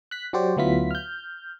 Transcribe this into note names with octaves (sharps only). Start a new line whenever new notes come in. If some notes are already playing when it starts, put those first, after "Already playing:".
F#6 B6
F#3 F#4 G4 C5 D5
D2 F#3 B3 E4 F4 B6
F6 G6